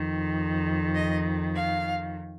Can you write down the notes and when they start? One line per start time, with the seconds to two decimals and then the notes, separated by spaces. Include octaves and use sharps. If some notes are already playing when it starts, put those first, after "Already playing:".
Already playing: F2 D#3
0.95 D#5
1.55 F5